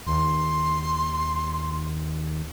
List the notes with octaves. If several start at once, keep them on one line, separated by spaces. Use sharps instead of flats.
D#2 C6